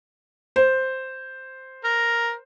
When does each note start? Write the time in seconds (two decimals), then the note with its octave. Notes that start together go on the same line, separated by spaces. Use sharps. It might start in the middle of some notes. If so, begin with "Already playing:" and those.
0.56 C5
1.84 A#4